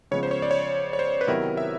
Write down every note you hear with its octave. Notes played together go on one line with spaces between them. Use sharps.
C#3 F3 G#3 B3 C#5
C5
C#5
D5
C#5
C#5
C5
B4
C3 D#3 F#3 B3 E4 A#4
E5